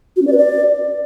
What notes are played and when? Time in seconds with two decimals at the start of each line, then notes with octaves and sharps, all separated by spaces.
0.16 F#4
0.22 C#4
0.27 D5
0.32 B4
0.38 D5